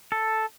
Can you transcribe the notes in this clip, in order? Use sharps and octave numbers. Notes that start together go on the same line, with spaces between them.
A4